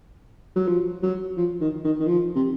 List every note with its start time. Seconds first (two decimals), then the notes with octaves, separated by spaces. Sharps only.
0.56 F#3
0.67 F3
1.02 F#3
1.37 F3
1.61 D#3
1.84 D#3
2.00 D#3
2.07 F3
2.36 C3